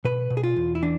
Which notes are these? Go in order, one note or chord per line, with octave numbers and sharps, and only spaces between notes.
B2 B4
B2
G#4
F4
E2
E4
E3 D4